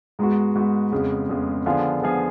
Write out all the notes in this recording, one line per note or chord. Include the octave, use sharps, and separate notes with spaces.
G#2 G#3 B3 F#4
G#2 G#3 B3 F#4
F2 C#3 G#3 B3
F2 C#3 G#3 B3
D3 F3 B3 F4 G#4
D3 F3 B3 F4 G#4